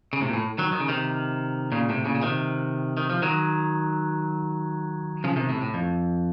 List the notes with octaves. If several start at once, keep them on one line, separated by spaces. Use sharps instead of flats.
C#3
A2 C3
A#2
A2
D#3 F#3
D#3
C#3
C3 D#3
A#2 C#3
A2 C3
A#2 C#3
C#3
C3 D#3
D#3
F3
D#3 F#3
C#3 F3
C3 D#3
A2 C3
A2
F2